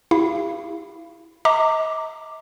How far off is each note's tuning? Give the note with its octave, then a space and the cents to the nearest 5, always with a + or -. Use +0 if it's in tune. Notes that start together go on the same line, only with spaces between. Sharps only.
E4 -10 G4 +35 F5 -35
D#5 +35 A#5 -30 D6 +0